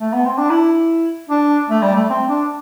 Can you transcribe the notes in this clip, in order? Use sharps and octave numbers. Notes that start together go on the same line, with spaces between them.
A3
B3
C4
D4
E4
D4
A3
G3
A3
C4
D4